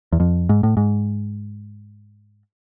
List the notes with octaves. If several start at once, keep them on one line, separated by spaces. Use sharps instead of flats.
E2
F2
G#2
A2
G#2